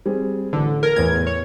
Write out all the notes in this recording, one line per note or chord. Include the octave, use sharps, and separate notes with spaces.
G3 C4 G#4
A1 D3 E3
A#4 G#6
E2 A2 B4 G#6
C#5